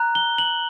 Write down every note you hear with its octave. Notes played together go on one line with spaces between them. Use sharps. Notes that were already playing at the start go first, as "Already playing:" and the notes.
Already playing: A#5 F#6
G7
F#7